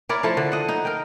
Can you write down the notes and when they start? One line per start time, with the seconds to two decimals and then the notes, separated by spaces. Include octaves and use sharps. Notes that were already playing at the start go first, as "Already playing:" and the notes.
0.09 E4 A#4 C#5 D5
0.23 F3 A3 E4 A4
0.37 D3
0.52 D#5 F#5
0.69 D#4
0.85 A#4 G5